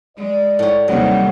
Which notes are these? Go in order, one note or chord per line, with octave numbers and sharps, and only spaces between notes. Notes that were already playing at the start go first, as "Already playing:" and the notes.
G#3 D5
A2 C#5
D#2 C3 F#3 G3